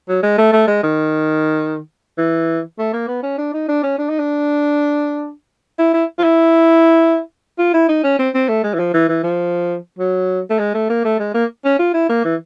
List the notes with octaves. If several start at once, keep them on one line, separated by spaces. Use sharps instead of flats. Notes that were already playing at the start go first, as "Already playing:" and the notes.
F#3
G#3
A3
A3
G#3
D#3
E3
A3
A#3
B3
C#4
D4
D#4
D4
C#4
D4
D#4
D4
E4
E4
F4
E4
F4
E4
D#4
C#4
C4
C4
A3
G#3
E3
F3
E3
E3
F3
F#3
A3
G#3
A3
A#3
A3
G#3
A#3
C#4
F4
E4
A#3
E3